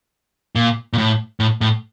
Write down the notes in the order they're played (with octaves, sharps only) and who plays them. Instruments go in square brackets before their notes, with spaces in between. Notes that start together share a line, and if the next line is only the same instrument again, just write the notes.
[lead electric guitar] A#2
A#2
A2
A2
A2